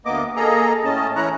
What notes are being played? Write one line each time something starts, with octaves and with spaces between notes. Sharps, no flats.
D2 A#3 B3 D#5 D6
A#3 G#4 A4 D#5 A#5
A2 C#4 D#5 A5
E3 C#4 E4 C#5 A#5 F#6